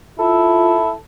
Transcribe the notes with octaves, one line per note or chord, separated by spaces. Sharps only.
E4 F4 A4